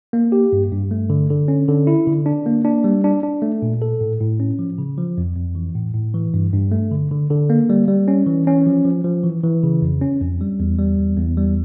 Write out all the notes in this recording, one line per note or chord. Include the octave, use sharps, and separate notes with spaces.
A#3
G4
G2
G2
A3
D3
D3
C#4
D3
E4
D3
D4
A#3
D4
G3
D4
D4
A3
A#2
A4
A2
A2
C#4
F3
C#3
F3
F2
F2
E3
A2
A2
E3
G2
G2
A3
D3
D3
D3
A#3
G3
G3
C#4
E3
C#4
F3
F3
F3
E3
E3
C#3
F2
C#4
F2
G3
E2
G3
E2
E2
G3